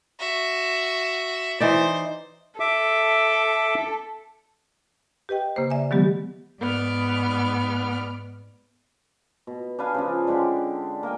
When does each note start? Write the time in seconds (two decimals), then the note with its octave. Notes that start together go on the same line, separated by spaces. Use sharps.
0.19 F#4 E5
1.60 E3 D#4 C5 D5
2.60 A4 E5 D6
5.29 G4 B4 D#5 G5
5.56 C#3 A#3 G4 C5
5.70 D5 E5 G#5
5.91 D#3 F#3 G#3 B3 G4
6.60 G#2 B3 D5 F6
9.47 B2
9.79 D4 B4 F5 G#5
9.94 C#3 F3 D4
10.27 D3 G#3 D4 G4
11.03 A#3 A#4 G5 G#5